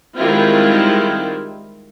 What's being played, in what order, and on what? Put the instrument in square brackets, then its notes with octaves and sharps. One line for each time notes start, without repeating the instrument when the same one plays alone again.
[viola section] D#3 G3 G#3 C4 E4 F4